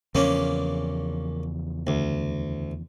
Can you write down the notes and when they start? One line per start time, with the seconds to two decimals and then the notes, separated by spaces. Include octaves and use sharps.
0.15 E2 C#3 F3 A#3 C#4 D4
1.87 D2